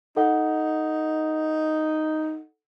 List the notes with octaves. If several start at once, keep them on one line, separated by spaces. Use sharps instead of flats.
D#4 A4 F#5